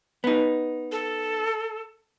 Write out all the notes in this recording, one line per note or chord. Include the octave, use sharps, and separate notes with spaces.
B3 D#4
A4